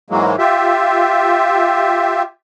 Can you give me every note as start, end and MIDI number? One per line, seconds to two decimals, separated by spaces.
0.10 0.36 44
0.10 0.36 52
0.10 0.36 54
0.10 0.36 56
0.10 0.36 58
0.38 2.23 65
0.38 2.23 67
0.38 2.23 76